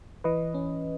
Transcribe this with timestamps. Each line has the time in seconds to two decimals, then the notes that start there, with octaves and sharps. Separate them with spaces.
0.24 E3 B4 D#5
0.54 C#4